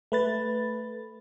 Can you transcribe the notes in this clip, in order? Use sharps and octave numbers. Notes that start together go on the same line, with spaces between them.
A3 B4 A6